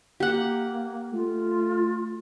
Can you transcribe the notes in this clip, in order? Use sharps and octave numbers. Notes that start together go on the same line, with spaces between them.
A#3 G4 F#5
A3 F4